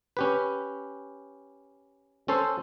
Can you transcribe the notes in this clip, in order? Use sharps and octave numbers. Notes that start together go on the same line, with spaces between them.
C#4 G4 B4
C#4 A4 C5